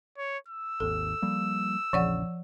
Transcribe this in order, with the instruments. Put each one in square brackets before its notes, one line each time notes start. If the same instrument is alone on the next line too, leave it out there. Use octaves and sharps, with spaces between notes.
[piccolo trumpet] C#5
E6
[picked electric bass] G#1 D#2 [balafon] A4
[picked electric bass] F3 G3 A#3
[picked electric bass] A#1 E2 C#3 [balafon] F3 D5 F#5